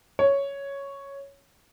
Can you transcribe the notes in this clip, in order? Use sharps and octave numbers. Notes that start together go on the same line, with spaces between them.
C#5